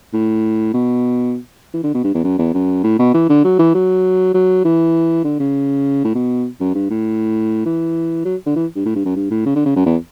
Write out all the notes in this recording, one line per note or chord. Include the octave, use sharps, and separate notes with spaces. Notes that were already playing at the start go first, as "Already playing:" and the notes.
A2
B2
E3
D3
B2
G2
E2
F#2
E2
F#2
A2
B2
E3
D3
F#3
E3
F#3
F#3
E3
D3
C#3
A2
B2
F#2
G2
A2
E3
F#3
D3
E3
G2
A2
G2
F#2
G2
A2
C#3
D3
C#3
F#2
E2